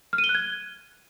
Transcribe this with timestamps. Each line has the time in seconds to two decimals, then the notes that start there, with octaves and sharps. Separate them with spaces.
0.13 F6
0.18 D#7
0.24 G7
0.29 F#6
0.35 G#6